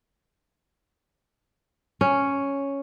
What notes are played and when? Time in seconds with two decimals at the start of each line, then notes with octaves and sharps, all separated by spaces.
2.01 C#4